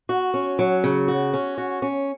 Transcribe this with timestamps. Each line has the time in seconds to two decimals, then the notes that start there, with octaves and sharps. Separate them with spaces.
0.09 F#4
0.34 C#4
0.59 F#3
0.84 C#3
1.08 F#4
1.34 C#4
1.58 F#4
1.82 C#4